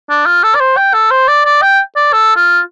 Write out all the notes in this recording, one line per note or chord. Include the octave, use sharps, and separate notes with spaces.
D4
F4
A4
D5
C5
G5
A4
C5
D5
D5
G5
D5
A4
F4